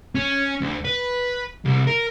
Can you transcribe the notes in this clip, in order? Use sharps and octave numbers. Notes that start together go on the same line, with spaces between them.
C#4
D2
B4
C2
A#4